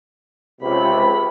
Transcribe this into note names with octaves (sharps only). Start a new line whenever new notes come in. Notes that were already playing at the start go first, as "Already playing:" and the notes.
C#2 C3 B5